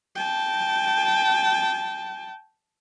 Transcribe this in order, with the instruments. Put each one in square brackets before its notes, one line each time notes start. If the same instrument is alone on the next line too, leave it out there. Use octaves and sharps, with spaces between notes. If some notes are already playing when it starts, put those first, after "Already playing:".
[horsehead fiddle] G5 A5